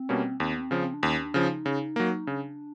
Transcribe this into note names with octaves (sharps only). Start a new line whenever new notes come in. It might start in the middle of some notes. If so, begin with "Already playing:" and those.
Already playing: C4
B2 G3 A#3 C#4
D#2 C4
B3
C4
C#3 F3
C4
D4
D#2 C#4
D4
C#3 F3
D#4
C#3
F#3 A#3
C#3 D4